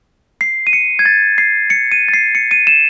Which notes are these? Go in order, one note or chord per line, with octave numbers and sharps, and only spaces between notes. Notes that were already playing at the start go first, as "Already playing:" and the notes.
C7
D#7
C#7
G#6
A6
C7
C#7
D#7
A6
C7
C#7
D#7
E7